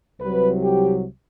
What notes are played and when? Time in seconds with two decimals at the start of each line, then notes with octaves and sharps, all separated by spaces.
0.19 C2 C3 F#3 B4
0.63 G4